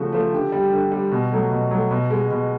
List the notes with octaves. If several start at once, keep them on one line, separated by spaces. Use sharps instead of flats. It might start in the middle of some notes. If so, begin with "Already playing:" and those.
Already playing: C#3 F3 A3 F#4
F3 A3
D3 G4
G3
D3
G3
B2
F#3 A3
B2
F#3 A3
B2
G#3
B2